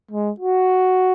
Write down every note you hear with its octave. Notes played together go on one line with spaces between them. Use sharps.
G#3
F#4